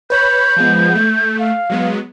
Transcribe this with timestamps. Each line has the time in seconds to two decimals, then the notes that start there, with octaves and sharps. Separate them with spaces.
0.10 B4 C#5 B5 G6
0.57 F3 G#3 B3
0.95 A3
1.39 F5
1.70 F#3 G#3 B3